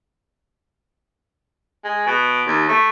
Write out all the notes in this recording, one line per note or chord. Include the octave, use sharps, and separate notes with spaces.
G#3
B2
D#2
A3